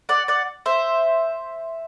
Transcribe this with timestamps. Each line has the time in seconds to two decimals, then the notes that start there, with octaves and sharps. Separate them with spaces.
0.09 D5 F#5
0.28 D5 F#5
0.66 C5 E5